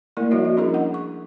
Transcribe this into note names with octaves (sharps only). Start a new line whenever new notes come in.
A3 A#3 E4 A#4 D5
F3 G3 D#4 F#4 C#5 D#5
F#4
C#4 D4 E4 G#4 A#4 D#5
F#5
C#6